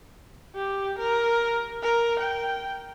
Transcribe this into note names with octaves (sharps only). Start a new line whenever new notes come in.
G4
A#4
A#4
G5